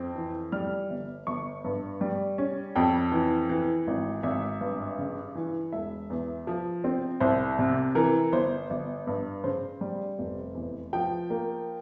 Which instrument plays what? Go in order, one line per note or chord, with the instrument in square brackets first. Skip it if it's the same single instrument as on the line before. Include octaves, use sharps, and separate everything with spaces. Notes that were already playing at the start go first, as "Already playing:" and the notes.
Already playing: [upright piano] F2 C4
E3
G3 F6
G1
G1 C#6
G2
G3
C#4
F2 G5
E3
E3
G#1
G#1 E5
G2
C#3
E3
E1 E5
E2
F3
C4
C2 C5
C3
E3 A#4
G1 C5
G1
G2
C#3 C5
G3
F1
E2
F3 G5
A#3